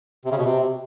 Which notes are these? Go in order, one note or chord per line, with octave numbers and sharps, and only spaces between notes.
C3
C#3
B2
C3